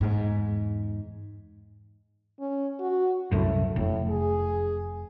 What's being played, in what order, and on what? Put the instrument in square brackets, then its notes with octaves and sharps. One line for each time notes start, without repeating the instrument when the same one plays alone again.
[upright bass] E2 G#2
[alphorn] C#4
F#4
[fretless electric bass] C2 F#2 A2 [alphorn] A3
[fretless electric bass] F1 [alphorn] A2
[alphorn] G#4